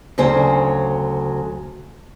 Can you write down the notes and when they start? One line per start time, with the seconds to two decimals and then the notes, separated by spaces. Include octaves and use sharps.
0.18 D2 C#3 F#3 C5 G#5